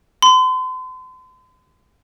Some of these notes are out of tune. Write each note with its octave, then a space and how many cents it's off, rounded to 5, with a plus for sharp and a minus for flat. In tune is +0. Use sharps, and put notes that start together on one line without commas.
C6 -40